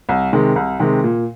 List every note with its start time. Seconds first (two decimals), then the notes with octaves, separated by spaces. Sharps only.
0.09 C2
0.33 C3 D#3 G#3
0.56 C2
0.80 C3 D#3 G#3
1.04 A#2